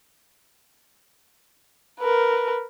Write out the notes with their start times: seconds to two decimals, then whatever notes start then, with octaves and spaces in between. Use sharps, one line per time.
2.00 A#4 B4